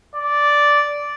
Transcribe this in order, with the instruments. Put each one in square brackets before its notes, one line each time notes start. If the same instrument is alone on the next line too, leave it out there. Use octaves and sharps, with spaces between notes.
[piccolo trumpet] D5